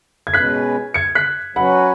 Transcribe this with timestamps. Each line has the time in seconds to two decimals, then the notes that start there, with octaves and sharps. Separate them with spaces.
0.27 G#6
0.34 B2 G#3 C#4 B4 F#6 B6
0.94 G#6 C#7
1.15 F#6 B6
1.56 F#3 C#4 F#4 B4 F#5 B5